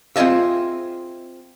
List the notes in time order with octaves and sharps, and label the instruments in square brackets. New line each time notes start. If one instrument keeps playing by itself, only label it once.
[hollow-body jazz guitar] C4 F4 G#4 D#5 E5